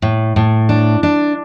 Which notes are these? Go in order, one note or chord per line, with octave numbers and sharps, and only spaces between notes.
A2
A2
D4
D4